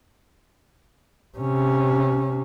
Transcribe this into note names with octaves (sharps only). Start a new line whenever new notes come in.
C3 C#4